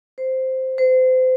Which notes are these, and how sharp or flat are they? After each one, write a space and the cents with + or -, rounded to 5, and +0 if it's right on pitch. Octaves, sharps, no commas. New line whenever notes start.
C5 -5
C5 -30